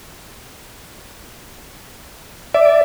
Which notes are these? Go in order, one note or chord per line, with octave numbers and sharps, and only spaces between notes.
D5 E5